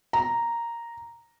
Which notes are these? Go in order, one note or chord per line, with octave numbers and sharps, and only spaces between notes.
A#5